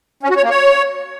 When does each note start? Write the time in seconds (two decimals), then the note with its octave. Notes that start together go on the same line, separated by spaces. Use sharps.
0.23 C#4
0.30 F#4
0.37 C#5
0.43 A#3
0.50 C#5